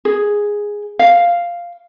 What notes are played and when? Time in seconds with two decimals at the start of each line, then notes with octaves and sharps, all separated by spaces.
0.05 G#4
0.99 F5